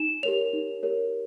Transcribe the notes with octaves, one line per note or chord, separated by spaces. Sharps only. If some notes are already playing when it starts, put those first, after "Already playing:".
Already playing: D#4 E7
G4 A#4 C#5 F7
D#4
G4 A#4 C#5